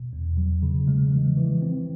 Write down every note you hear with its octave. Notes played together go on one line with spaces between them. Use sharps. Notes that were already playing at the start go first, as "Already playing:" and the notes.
Already playing: B2
E2
F#3
C#3
G#3
E3
E3
C4